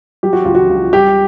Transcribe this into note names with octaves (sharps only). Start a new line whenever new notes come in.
F#3 G4
F#4
C#2 F4
F#4
C#2
G3 G4